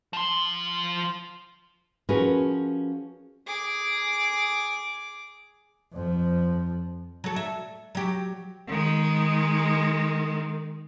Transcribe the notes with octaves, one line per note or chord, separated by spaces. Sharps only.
F3 C6
F3 C#4 F#4 G#4 A#4 B4
G#4 D6
F2 F3
F#3 A4
E5
F#3 G4
D#3 G#3